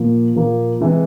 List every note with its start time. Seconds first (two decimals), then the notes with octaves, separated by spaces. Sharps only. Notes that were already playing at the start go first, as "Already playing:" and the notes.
Already playing: A#2 F3 A#3
0.36 A#2 F3 A#3
0.81 C3 E3 G#3